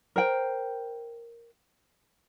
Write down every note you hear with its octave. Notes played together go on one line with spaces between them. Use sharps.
A#4 C5 G5